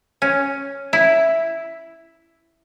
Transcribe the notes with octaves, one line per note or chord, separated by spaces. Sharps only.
C#4
E4